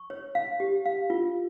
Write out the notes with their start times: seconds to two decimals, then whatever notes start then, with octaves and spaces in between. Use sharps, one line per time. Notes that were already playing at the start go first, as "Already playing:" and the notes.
Already playing: C#6
0.10 C#5
0.35 F5
0.60 G4
0.86 F5
1.10 F4